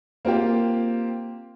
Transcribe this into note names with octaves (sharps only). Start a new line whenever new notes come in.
A#3 C4 F4 G4